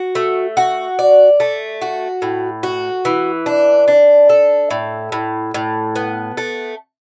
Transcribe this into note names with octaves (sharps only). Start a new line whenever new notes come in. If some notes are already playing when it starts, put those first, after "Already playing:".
Already playing: F#4
A3
F#4
D5
A3
F#4
A2
F#4
E3
D4
D4
A4
A2
A2
A2
B3
A3